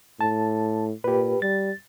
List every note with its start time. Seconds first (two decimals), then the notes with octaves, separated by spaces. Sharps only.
0.21 A2 A5
1.04 A#2 G4 B4
1.42 G3 A6